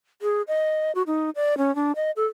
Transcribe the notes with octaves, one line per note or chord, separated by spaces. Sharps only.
G#4
D#5
F#4
D#4
D5
C#4
D4
D#5
A4